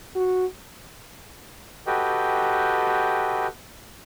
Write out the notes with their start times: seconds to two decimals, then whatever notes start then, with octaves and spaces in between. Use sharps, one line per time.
0.15 F#4
1.87 F#4 G4 A4 B4 D#5 G5